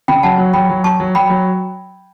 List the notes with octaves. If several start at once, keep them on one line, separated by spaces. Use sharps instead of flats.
C#3 G5 B5
F#3 F#5 A5
F#3
F#3 G5 B5
F#3
F#3 A5 C#6
F#3
F#3 G5 B5
F#3